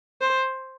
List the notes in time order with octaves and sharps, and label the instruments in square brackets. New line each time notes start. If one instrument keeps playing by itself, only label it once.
[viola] C5